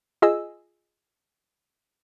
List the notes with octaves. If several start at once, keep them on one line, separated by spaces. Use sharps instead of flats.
F4 G#4 D#5 G#5 E6